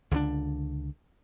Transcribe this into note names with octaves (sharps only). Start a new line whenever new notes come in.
C#2 D3 A3 D4